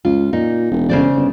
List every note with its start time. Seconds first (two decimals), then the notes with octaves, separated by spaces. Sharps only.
0.05 C#2 F4
0.33 A#2 D#4
0.71 E1
0.89 C#3 C5 D5
1.16 G1